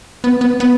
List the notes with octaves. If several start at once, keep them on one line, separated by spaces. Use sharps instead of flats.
B3
B3
B3